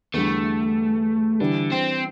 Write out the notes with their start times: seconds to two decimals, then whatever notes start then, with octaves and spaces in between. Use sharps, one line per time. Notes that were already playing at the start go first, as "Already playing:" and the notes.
0.13 E2 D3 G3 A3
1.40 D3 E3 G3 D4 G4
1.71 C4